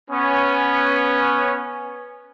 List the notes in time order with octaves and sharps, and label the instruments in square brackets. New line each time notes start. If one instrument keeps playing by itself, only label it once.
[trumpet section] B3 C#4